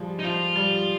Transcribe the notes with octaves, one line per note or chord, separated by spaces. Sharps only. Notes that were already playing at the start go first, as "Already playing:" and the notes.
Already playing: F3 G3 G#3
D#4
F3 F4
G3